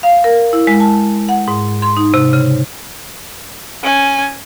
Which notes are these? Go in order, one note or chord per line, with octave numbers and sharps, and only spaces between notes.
F5
A#4
E4
G#3
A5
F#5
G#2
C6
D#4
C3
C#3
C#4 G#5